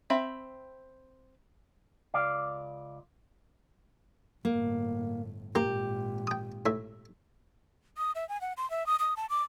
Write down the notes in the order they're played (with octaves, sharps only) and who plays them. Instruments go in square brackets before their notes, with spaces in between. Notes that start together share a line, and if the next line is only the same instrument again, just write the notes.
[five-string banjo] C4 E5 B5
[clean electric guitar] C#2 D5 F5
[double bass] G1 A2 [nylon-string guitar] A#3
[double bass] G#1 A#2 [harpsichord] A#3 [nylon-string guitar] G4
[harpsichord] G5 D#6
A2 E5
[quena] D#6
E5
G#5
F#5
C6
E5
D#6
D#6
A5
D6